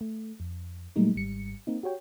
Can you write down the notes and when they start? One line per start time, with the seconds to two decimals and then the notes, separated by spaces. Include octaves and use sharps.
0.01 A3
0.40 F2
0.96 A#2 F#3 G3 A3 A#3 D#4
1.15 G#1 G#2 G3 C#7
1.67 A#3 C4 D#4
1.83 F#4 G4 C#5 G5